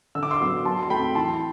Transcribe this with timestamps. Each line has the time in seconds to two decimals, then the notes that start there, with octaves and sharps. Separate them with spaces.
0.15 D3 E6
0.23 D6
0.31 C6 E6
0.40 F#3 B3
0.65 F#3 A5 C6
0.83 C6
0.90 A3 C4 G5 B5
1.15 E3 A5 C6